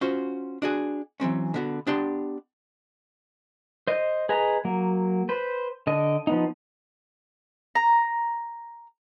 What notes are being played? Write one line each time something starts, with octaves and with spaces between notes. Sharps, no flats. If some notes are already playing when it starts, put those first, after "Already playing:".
C#4 F4 F#4 C5
D4 F#4 G#4
E3 F#3 C4 C#4
D3 B3 F#4
B3 D4 G4 C6
C5 D#5
G#4 B4 D#5 A#5
F#3 A#3
B4 C5
D3 D#5
F3 B3 D#4
A#5